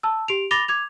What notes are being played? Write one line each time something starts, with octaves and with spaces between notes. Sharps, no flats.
A5 E6
G4 D7 F7
B5 D6 A6 A#6 F7 G7
D6 G#6 F7